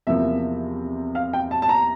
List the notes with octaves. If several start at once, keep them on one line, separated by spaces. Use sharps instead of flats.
E2 C3 F3 A#3 E5
F5
G5
A5
A5
A#5